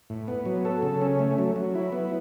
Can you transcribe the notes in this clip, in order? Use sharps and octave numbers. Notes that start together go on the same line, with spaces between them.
A2
B3
F#3
A4
C#3
C#4
A3
F#3
F#3
E4
B3